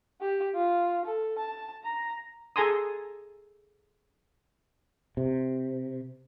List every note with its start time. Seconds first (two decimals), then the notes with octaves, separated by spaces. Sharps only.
0.21 G4
0.55 F4
1.05 A4
1.38 A5
1.84 A#5
2.56 G#4 A4 G#5 A#5 C6 D#6
5.17 C3